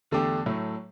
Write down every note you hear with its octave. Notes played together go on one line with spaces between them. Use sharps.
E2 D3 A3 D4 G4
A2 F#3 A3